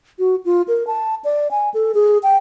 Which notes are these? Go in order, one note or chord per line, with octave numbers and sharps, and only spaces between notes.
F#4
F4
A#4
A5
D5
G#5
A4
G#4
G5